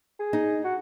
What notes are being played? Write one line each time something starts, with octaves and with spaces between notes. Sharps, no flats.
G#4
D#4
F#4